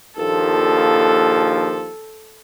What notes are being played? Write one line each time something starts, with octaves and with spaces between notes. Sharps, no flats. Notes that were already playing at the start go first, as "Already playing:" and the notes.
A#1 D#2 F3 A4